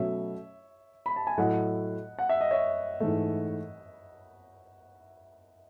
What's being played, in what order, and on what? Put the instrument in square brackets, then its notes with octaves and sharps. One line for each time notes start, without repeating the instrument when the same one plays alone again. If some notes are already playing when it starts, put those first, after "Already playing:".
Already playing: [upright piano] B2 F#3 A3 C#4 [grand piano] C#5 E5
[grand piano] B5
A5
G#5
[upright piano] A2 F#3 A3 [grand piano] D#5 F#5
[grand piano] F#5
E5
D#5
C#5 E5
[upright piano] G#2 E3 A3